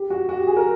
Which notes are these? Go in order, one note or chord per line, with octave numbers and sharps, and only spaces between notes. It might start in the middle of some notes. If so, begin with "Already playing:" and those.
Already playing: G4
F#4
F#4
G4
G#4
A#4